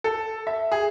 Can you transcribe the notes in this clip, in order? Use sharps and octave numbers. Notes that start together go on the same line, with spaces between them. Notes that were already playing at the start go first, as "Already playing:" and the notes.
A4
E5
G#4